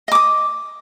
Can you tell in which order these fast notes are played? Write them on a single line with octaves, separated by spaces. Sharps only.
D#5 D6 D#6